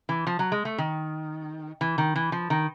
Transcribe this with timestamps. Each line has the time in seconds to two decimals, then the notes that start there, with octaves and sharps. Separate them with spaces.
0.09 E3
0.27 F3
0.39 F#3
0.52 G#3
0.65 A3
0.78 D#3
1.81 E3
1.98 D#3
2.16 E3
2.32 F3
2.50 D#3